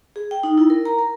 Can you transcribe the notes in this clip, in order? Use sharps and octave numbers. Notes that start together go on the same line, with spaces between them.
G#4
G5
D#4
E4
A#4
A#5
A#4